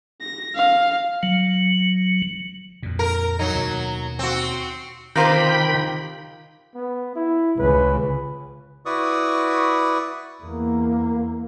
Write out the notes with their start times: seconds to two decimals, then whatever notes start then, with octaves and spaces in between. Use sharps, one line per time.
0.21 A#6
0.55 F5
1.23 F#3
2.83 F2 A#2
2.99 A#4
3.39 F#3 D#4
3.55 D#2 B2
4.19 C4 F#4
5.16 C3 D#3 F4 A#4 C5 G5 B5 D6
6.75 B3
7.16 E4
7.59 C#2 C#3 B4
8.86 E4 F#4 B4 D5 C#6 D#6
10.43 E2 A#3